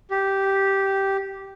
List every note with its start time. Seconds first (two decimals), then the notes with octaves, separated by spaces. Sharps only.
0.11 G4